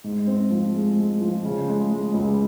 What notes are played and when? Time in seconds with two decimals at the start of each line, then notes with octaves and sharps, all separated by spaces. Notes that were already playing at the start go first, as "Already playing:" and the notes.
0.04 G#2
0.27 C4
0.50 F3
0.75 G#3
0.98 G#3
1.21 F3
1.45 C#3
1.68 G#3
1.91 G#3
2.14 C#2